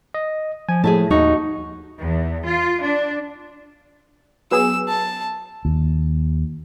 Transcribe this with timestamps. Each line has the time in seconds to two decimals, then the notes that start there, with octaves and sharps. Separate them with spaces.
0.14 D#5
0.69 F3 G#5
0.84 A2 G#4 E5 A5
1.11 D#2 D#4 F#4 C#6
2.00 E2
2.45 F4
2.82 D4
4.51 F#3 B3 G#4 E6
4.88 A5
5.65 D#2